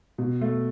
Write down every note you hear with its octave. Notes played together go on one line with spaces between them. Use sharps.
B2
A3